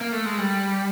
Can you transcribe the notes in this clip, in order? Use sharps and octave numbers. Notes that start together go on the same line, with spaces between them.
A#3
A3
G#3
G3